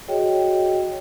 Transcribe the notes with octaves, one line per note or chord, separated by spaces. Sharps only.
F#4 G#4 C#5 D#5 G5